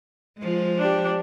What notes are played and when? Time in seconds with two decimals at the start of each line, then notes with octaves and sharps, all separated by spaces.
0.38 F3 G#3
0.78 D4 G4